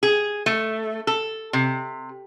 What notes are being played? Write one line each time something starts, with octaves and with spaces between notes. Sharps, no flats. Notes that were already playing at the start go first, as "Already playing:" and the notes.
G#4
A3
A4
C3